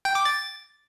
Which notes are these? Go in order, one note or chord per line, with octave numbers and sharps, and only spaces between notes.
G5
D6
A6